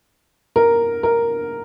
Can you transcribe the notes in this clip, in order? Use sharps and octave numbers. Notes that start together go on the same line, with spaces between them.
A#4
A#4